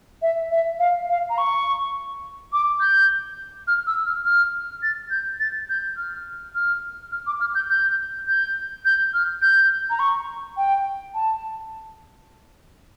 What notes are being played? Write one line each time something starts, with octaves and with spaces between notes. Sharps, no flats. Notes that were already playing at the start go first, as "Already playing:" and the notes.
E5
E5
F5
F5
A#5
C#6
D6
G6
F6
E6
F6
F6
A6
G6
A6
G6
F6
F6
F6
D6
F6
G6
G6
G6
G6
F6
G6
A#5
C#6
G5
A5